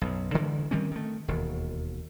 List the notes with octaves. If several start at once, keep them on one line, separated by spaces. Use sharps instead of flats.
B1 F#2
D3 E3 G#3
D#3 G3 C4 C#4
D#3 A3
E1 D#2